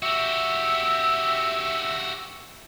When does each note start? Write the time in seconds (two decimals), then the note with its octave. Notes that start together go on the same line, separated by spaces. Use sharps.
0.02 F#4 G4 E5